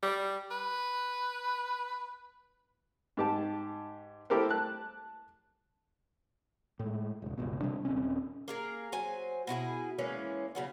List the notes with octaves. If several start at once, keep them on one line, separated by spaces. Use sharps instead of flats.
G3
B4
G#2 G4 A5
E4 G4 A4 A#4 C5
A5 F#6
A2 G#3
E1 C#2
G1 C#2 B2
C3 G3 D4
D#1 C4 C#4
A#3 G#4 A#4
F#3 C5 G#5
B2 E4 F4 G#4
E3 G#3 A#3 C#4
C#3 F#3 B3